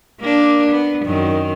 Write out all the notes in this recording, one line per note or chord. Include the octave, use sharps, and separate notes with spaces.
A#3 D4
B3
F#2 D#3